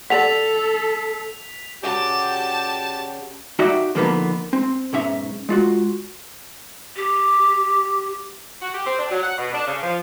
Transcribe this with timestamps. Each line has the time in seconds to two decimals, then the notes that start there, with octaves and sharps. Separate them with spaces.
0.10 A4 D5 D#5 F#5 B6 F7
1.83 C#3 F#4 G4 D5 A5 E7
3.59 D#4 F#4 G4 D5 E5
3.95 D3 F3 A#3 B3 D#4 B4
4.53 C4
4.93 B1 G#2 C#4 E5
5.49 G#3 F4 F#4
6.97 G4
8.62 F#4
8.74 G4
8.86 C4
8.99 D4
9.11 F#3
9.23 F#5
9.38 B2
9.54 D4
9.67 C#3
9.82 F3